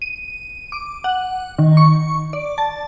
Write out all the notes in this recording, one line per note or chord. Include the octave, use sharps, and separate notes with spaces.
D#7
D6
F#5
D#3
C#6
D5
A5